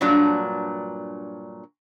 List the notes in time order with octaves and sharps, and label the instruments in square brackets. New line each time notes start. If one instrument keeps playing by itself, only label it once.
[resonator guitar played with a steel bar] G2 A#2 F#3 D4